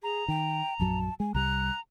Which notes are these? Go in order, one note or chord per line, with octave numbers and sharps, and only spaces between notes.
G#4 A#5
D#3 G5
A#1 F#2 F#3 A5
G#3 G#5
C2 G3 A#5 F#6